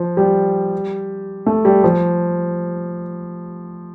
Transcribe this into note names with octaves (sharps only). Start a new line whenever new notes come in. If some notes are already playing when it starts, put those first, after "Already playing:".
Already playing: F3
G3
A3
G3
F3